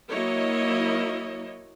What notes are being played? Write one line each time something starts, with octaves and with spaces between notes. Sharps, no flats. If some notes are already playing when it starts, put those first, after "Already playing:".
F#3 A#3 E4 C#5 D#5